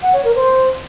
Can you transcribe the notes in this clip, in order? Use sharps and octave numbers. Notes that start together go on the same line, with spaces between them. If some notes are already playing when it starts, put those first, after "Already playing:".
F#5
C#5
A#4
C5